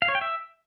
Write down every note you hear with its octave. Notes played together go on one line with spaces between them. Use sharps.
F5
C#5
G5
E5